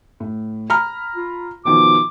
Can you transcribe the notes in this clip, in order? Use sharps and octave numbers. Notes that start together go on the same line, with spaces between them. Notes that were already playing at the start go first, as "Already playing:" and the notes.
A2
A#5 B5 F6
F4
B2 D#3 F3 D6